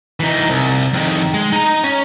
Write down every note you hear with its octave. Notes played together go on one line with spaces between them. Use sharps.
E3 D#4
C2
F2 D#3
G#3
D#4 A#5
C#4